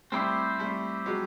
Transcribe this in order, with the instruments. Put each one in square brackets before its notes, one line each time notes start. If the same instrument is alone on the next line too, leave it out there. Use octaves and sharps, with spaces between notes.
[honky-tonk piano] G3 A3 [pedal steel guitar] C4 E4 G4 C5
[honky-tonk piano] G3 A3
F#3 G#3